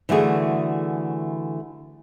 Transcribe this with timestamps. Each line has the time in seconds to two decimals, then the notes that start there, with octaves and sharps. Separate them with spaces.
0.09 D3 E3 G3 A3 F#4 G#4